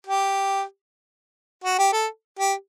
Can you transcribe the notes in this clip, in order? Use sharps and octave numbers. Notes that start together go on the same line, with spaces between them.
G4
F#4
G4
A4
G4